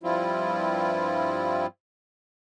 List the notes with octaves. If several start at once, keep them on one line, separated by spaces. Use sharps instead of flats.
G2 F3 G3 C4 E4 F4